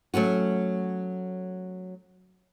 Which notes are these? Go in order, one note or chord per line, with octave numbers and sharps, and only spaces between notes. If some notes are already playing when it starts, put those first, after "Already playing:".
F#3 A3 C#4 F#4